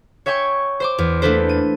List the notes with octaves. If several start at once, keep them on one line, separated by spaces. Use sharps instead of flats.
C#5 E5 G5 G#5 C#6
C5 C6 D6
E2
A3 A#3 D4 A4 B4 C5
D#7